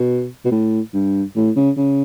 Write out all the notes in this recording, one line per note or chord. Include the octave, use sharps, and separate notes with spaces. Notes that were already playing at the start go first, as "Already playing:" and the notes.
Already playing: B2
B2
A2
G2
A2
C#3
C#3